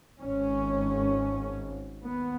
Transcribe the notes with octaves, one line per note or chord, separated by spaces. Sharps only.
G#1 G#2 C#4
D#2 B3